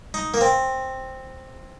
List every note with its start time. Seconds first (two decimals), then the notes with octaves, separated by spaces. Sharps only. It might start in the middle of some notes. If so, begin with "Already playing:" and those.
0.14 D#4
0.34 A#3
0.41 C4